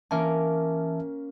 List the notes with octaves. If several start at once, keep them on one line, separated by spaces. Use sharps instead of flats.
E3 A#3 C#4 A#4 E5 A5